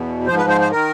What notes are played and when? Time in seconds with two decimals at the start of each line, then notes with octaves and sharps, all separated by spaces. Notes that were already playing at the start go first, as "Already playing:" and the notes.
Already playing: E2 B2
0.27 G#2 F3 C5
0.38 B4
0.49 C5
0.61 C5
0.72 D#3 A#4